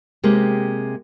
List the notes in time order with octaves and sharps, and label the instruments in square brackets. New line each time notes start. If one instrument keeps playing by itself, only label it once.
[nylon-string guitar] C3 G#3 A#3 G4